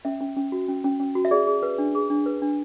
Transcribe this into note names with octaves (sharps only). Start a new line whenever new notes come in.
C#4 E5
C#4
C#4
F#4
C#4
C#4
C#4
F#4
E5
G#4 D5
G#4
B4
D4
G#4
D4
B4
D4